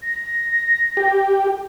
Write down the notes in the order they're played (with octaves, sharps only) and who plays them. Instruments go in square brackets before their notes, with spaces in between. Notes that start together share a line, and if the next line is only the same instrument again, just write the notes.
[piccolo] A#6
[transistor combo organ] G4